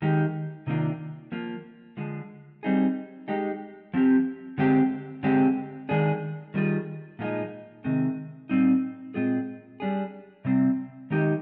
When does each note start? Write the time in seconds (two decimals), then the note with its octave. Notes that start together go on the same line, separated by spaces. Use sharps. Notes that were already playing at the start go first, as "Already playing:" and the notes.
0.02 D#3 G#3 D#4 G4
0.67 C3 D#3 A#3 D4 F4
1.32 F3 A#3 F4
1.97 D3 F3 G#3
2.63 G3 C4 D#4 G#4
3.28 G#3 D#4 G4
3.94 F3 C4 G4
4.58 D3 G#3 C4 G4
5.23 D3 G#3 C4 G4
5.89 D#3 G#3 D4 G#4
6.54 D#3 G3 C4 F4 G#4
7.19 A#2 F3 G#3 D#4
7.84 C3 D#3 G#3 C4
8.49 A#2 G3 C4 D#4
9.14 A#2 G#3 C4 F4 G#4
9.80 G3 D4 G#4
10.45 C3 G3 C4
11.10 D#3 G#3 D#4 G4